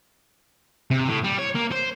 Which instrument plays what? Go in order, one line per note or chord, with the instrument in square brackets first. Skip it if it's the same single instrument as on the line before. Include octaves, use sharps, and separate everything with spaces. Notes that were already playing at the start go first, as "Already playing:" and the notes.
[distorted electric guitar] C3
A2
G3
C#5
A#3
C5